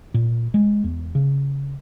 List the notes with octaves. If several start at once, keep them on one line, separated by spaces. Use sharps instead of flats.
A#2
G#3
E2
C#3